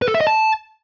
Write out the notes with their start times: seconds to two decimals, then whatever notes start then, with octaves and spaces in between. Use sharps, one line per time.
0.02 B4
0.08 A4
0.14 E5
0.21 D#5
0.27 A5